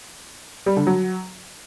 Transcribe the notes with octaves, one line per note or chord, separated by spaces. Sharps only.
G3
D3
F#3